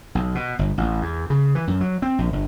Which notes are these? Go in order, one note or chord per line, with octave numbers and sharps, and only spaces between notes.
B1
B2
G1
A1
E2
C#3
E3
F#2
F#3
C4
A#1
G1